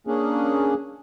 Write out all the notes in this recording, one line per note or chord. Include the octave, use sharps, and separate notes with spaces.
A#3 C#4 D4 G#4